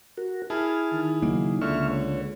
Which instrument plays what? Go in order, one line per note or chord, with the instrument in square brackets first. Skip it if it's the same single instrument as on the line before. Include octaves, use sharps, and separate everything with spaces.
[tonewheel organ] F#4 A#4
[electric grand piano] E4 G#4 [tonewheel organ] A5 F6
[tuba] D#3
[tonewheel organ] C#3 F#3 D#4 [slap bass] A#3
[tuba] C#2 [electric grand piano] D3 [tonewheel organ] E5 C#6 F6
[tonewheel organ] C#5